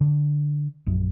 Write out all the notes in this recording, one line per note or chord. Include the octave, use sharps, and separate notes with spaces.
D3
A#1 F#2